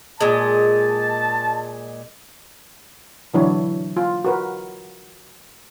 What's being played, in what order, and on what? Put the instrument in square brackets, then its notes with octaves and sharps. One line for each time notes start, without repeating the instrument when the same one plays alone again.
[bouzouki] A#2 G#3 [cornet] A5
[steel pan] D3 E3 F#3 D4 E4 C#5
F4
F#4 A#4 B4